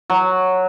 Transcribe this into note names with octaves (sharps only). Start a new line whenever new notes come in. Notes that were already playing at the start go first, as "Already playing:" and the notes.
F#3